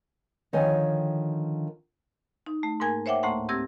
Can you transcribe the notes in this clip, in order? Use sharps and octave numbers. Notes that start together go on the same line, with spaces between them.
D3 D#3 F3 C#5 G#5
D#4
A3
G#2 A#3 A#4 G#5 G#6
C5 C#5 E5 F#5 G5 D6
D2 A2 A3 A#3 F#5 C6
C4 G4 E6 G#6 A#6